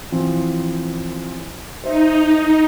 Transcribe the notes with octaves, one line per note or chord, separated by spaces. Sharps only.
E3 F3 C4
D#4 C5 E5